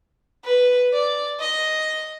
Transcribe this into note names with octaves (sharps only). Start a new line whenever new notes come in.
B4
D5
D#5